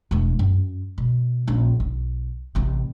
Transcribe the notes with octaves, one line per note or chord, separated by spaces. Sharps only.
E1 A3
F#2
B2
A#1 C#4
B1
A1 C3